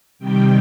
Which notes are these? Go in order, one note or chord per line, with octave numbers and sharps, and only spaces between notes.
C3 D#3 G3 G5